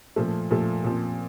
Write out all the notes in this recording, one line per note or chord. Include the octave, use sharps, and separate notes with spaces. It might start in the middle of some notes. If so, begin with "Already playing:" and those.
A#2 F3 A3
A#2 F3 A3
A#2 F3 C4